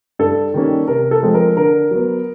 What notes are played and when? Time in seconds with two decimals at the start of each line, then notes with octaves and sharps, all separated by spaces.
0.19 G2 A4
0.54 D#3 G3 A#3 C#4
0.88 C3 A#4
1.11 A4
1.23 F3 G#3 C4
1.34 A#4
1.57 D3 A#4
1.91 F#3 B3